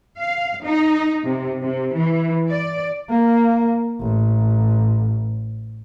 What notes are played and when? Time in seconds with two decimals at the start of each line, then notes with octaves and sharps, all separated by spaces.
0.17 F5
0.64 D#4
1.23 C3
1.61 C3
1.93 E3
2.49 D5
3.10 A#3
4.01 A1